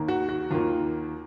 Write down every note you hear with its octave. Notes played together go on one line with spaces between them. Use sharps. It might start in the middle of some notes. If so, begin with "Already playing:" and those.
Already playing: D#2 D#3 A#3
F#4
F#4
D#2 D#3 A#3 F4